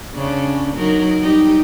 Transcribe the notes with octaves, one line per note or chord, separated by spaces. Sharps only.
C#3 C#4 D4
F#3 D#4 A#4
G3 D#4 G4